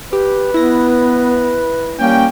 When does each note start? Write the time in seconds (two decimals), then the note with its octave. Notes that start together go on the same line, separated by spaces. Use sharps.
0.13 G4 B4
0.54 B3 E4 A#6
1.99 G3 A#3 C#4 G5